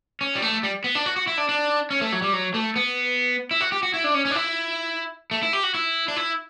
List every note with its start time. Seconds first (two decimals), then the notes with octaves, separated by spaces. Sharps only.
0.21 C#4
0.35 G3
0.42 A3
0.63 G3
0.84 B3
0.95 D4
1.06 F#4
1.16 F#4
1.27 E4
1.37 D4
1.49 D4
1.91 C#4
2.01 A3
2.12 F#3
2.22 G3
2.33 F#3
2.54 A3
2.76 B3
3.51 E4
3.61 F#4
3.72 G4
3.83 F#4
3.94 E4
4.04 D4
4.14 C#4
4.25 C#4
4.31 D4
4.35 E4
5.31 A3
5.43 E4
5.53 G4
5.63 F#4
5.74 E4
6.08 D4
6.16 E4